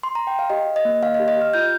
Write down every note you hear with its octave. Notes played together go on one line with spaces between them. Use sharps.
C6
A#5
G5
F5
G4 D#5
G4
D#5
A#3
A#3 F5
D#5
G4
D#5
G4 F6
F4 G6